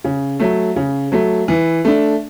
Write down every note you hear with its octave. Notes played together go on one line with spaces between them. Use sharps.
C#3
F#3 A3
C#3
F#3 A3
E3
A3 D4